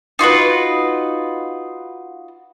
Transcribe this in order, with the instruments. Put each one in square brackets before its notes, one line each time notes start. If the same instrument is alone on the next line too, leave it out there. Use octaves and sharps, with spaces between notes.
[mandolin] D#4 F4 F#4 B4